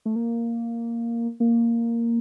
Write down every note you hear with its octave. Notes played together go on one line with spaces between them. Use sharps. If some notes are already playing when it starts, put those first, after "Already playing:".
A3
A#3
A#3